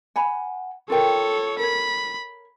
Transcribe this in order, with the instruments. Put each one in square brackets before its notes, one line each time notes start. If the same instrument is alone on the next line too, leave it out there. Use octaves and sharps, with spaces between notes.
[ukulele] F#5 G#5 B5
[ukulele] F4 A#4 G5 [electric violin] A4 C#5
[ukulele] A#4 C#5 [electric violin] B5